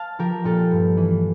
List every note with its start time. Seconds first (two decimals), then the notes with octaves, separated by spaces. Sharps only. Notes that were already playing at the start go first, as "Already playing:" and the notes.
Already playing: F5 A5
0.19 F3 G4 A#4
0.44 A#2 F4 A4
0.71 G2
0.97 E3